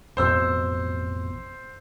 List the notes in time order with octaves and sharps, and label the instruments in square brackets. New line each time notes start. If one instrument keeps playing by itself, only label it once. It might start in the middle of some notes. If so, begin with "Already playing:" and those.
[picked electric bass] A1 F2 B2 [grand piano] C5 E6